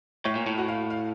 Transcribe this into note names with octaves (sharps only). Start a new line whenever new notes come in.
A2 C#5 C#6
A#2
A2
F#4 F#5
F5
F5